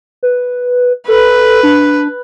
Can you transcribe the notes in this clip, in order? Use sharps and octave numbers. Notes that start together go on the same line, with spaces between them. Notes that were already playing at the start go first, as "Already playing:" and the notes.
B4
A4 B4
D4